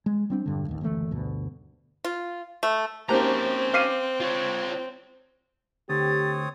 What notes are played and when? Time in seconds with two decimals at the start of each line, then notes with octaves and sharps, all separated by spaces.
0.06 G#3
0.30 G3 C4 D4
0.46 E1 G2 D3
0.68 A1 D#2
0.81 F#1 D2 E3 A3
1.11 D2 G2 B2
2.04 F4
2.63 A3
3.09 A#3 C4 C#4 D#4 G4 C5 A5 A#5
3.74 B4 F5 C6 D6 C7 D#7
4.20 F4 C#5
5.89 D2 C4 G4 C#5 D#6 A6